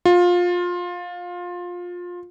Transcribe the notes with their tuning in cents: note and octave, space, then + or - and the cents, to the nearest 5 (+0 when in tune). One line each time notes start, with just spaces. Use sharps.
F4 +20